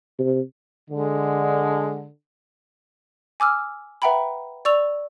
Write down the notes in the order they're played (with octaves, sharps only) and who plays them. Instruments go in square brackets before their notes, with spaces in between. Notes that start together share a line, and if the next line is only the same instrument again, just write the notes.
[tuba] C3
[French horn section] D3 [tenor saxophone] G#3
[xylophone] G#5 D6 E6 F6
B4 E5 F#5 G5 A#5 B5
D5 C#6 E6 F7